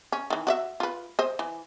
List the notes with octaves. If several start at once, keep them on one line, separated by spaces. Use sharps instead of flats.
C#4
D#3 E3
F#4 D5 E5
F4 B4
C5 D#5
E3